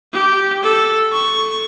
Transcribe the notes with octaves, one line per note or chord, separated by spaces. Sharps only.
G4
A4
C#6